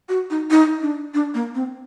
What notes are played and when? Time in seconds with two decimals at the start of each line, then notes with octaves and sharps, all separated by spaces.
0.09 F#4
0.30 D#4
0.51 D#4
0.81 D4
1.14 D4
1.34 A#3
1.55 C4